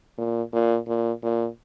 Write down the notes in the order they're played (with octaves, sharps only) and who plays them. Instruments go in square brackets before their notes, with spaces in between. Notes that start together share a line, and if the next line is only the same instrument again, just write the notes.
[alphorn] A#2
A#2
A#2
A#2